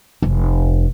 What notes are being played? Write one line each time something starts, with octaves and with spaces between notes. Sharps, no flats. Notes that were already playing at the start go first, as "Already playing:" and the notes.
F1